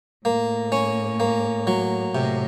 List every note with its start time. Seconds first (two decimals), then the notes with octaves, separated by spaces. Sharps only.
0.25 A2 A#3
0.72 C#4
1.20 A#3
1.67 F#3
2.14 A2 C3